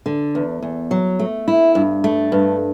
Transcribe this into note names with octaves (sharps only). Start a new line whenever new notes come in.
D3
E2
E2
F#3
A3
E4
G2
A3
G2